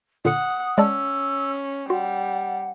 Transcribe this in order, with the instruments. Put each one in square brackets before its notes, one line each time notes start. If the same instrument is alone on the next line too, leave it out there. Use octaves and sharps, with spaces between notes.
[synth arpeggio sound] A#2 D3 C#7 [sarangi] F#5 [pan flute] D#6
[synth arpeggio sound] G#3 D5 A5 [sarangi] C#4 [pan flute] E6
[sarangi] G3 [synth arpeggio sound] F#4 C6 [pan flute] F#5